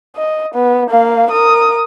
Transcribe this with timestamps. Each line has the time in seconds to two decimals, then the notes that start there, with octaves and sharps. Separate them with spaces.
0.16 D#5
0.54 B3
0.90 A#3 F5
1.30 A#4 D#6